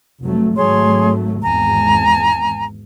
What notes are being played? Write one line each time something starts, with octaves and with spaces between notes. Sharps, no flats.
F1 F#3 A3
G#1 F#3 A3 G#4 C#5 C6
G#1 E2 G#2 G#5 A#5